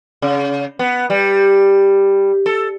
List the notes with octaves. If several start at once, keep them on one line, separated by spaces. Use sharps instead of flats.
C#3
B3
G3
A4